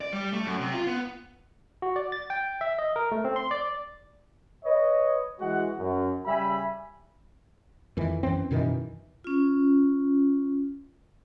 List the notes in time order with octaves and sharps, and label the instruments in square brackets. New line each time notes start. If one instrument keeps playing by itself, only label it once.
[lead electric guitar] D5
G3
A3
F#2
C3
F4
B3
[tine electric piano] F#4
D5
A6
G5
E5
D#5
A#4
A3
C4
C6
D5
[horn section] B4 C#5 D#5
E3 G#3 F#4 F#5
F#2
C#3 G3 E5 G#5 B5
[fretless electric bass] F2 D#3 E3
F#2 E3 C4
F#2 B2 D#3 E3
[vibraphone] C#4 F4